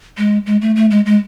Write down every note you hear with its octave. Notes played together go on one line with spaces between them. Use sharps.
G#3
G#3
A3
A3
G#3
G#3